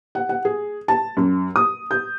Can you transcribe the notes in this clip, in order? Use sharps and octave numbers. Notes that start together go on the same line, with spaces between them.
F#5
F#5
G#4
A5
F#2
D#6
G6